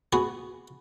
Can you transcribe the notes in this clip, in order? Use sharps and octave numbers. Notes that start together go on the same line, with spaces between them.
B3 F#4 G#4